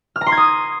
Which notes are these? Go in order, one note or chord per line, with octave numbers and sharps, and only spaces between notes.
F6
A#5
C6
G#6
D#6